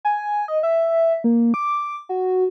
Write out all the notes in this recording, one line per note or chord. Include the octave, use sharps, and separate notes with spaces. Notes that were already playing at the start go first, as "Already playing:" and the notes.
G#5
D#5
E5
A#3
D6
F#4